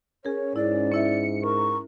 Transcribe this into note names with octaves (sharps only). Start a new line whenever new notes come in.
C#4 G#4 A#4 C#5
G#2 E4 D5
C#4 E4 E5 C#7
A#4 C#6